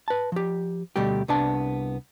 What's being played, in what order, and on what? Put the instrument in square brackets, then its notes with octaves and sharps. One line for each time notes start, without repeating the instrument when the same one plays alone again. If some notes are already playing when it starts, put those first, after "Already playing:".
[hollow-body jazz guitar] B4 A5
F3 G4
D2 B2 G3 A3 G4
C2 B3 D4 A5